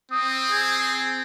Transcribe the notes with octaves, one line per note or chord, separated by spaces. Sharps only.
C4 D#6
G#4